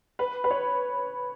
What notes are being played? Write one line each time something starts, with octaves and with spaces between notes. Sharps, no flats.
B4
B4
C#5